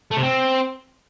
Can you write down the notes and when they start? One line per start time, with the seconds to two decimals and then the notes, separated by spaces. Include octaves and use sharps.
0.11 A3
0.17 C3
0.23 C4